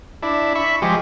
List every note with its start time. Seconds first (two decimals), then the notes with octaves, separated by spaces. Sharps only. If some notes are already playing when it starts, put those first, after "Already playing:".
0.22 D4 E4
0.55 E5 B5 C#6
0.82 F3 G#3 G4